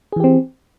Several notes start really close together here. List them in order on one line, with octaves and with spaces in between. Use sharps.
G#4 E3 G4 C4